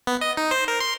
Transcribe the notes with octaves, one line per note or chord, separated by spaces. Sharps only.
B3
D#5
D#4
C5
A#4
C6